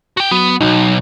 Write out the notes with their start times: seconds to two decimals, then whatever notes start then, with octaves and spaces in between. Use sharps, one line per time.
0.17 F#4 G5
0.31 F#3 B3
0.61 B1 F#3 D#4